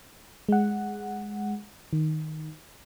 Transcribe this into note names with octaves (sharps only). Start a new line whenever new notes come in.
G#3 F#5
D#3